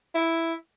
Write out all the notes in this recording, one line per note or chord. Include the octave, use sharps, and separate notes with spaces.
E4